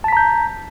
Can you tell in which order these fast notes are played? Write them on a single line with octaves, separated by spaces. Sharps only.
A5 B6 A#5 G6